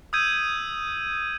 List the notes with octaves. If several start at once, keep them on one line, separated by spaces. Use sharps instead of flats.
D#6 E6 G6 G#6 D#7